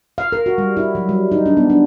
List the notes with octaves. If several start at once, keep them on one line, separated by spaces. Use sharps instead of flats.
F5
A#4
F#4
G3
E4
F#3
G3
D#4
D4
B3
D4